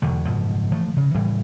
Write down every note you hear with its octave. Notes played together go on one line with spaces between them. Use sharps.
E1 E2 D3 G#3
F#1 G#2 B2 F3
E3 F3 A3
C#3
A2 E3 G3